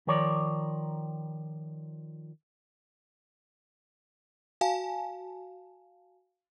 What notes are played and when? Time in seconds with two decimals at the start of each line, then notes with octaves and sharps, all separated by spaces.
0.07 D#3 F3 A#4 C#5 D5
4.61 F#4 F5 G#5 A5